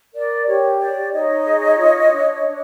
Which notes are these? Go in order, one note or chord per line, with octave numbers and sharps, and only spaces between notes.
A#4 D5
G4 C#5
C#5 D5
D#4 C#5 D#5
G#4
F4
D4
D4